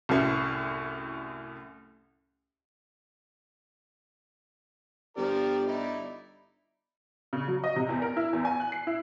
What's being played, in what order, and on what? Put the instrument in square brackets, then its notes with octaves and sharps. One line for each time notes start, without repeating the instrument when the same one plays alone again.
[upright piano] C2 F#2 A2 C#4
[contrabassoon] G1 [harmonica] F3 A#4 D5 [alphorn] G4
[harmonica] D#4 E4 D5
[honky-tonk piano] C#3
F#3
D#5
C3
E2
A#4
E4
E2
G#5
F#6
C7
E4